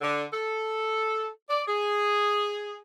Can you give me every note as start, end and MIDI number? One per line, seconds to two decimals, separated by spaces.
0.02 0.24 50
0.33 1.27 69
1.50 1.62 74
1.68 2.77 68